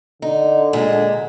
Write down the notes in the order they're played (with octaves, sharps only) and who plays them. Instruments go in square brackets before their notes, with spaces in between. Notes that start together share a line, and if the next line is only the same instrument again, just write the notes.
[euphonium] D3 [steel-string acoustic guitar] D#4
[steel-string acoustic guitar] A#2 G#3